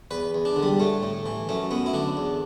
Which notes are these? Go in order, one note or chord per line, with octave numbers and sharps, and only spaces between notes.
E2 B4
E2
D4
D3
G3
A2 A3
A2
E3
F#2 A3
F#2 B3
E4
D3 D4
E2